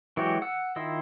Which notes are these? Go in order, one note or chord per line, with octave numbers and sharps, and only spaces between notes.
E3 F#3 G#3 F#4 G4
F#5 E6
D#3 E4 F4 D#5 E6